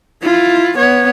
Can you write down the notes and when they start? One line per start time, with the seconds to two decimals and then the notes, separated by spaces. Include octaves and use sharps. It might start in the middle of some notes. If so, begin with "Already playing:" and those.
0.23 E4 F4
0.77 B3 C#5